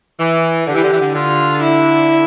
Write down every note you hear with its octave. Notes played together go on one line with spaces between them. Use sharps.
E3
D3 G4
E3
D3
E3
D3
D3 F4
E4